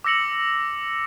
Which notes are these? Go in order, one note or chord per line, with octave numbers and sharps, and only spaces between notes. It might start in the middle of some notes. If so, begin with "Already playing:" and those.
D6 E6 A#6 C#7 F#7